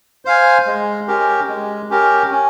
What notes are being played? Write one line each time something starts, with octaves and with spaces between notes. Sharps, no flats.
C5 F5 G#5
G#3
C#4 G4 A#4
G#3
C#4 G4 A#4
C#4